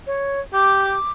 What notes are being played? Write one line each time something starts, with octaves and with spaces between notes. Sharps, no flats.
C#5
G4 D6